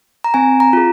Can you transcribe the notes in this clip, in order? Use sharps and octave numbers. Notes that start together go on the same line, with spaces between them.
A#5
C4 G#5
A#5
F4 G#4